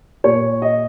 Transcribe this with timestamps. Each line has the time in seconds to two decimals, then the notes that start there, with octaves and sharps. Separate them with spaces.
0.24 A#2 C#5
0.62 D#5